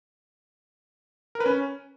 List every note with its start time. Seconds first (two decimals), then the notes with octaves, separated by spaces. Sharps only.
1.35 A#4
1.40 B4
1.46 C#4